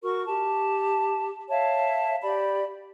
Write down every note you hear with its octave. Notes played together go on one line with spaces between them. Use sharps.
F#4 A#4 C#6
G4 A5
C#5 E5 F5 A5
G4 D5 B5